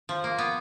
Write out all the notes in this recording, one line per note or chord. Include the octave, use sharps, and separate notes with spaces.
F3
A#3
B3